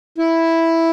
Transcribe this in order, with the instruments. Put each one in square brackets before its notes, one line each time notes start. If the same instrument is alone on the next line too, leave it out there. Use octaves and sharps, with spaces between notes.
[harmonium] E4